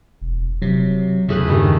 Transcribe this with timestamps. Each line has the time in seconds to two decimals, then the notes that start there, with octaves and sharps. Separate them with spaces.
0.21 E1
0.62 C3 F#3
1.29 E2 C#3 A3 G#4 B4
1.48 G2 D#3 G3 A3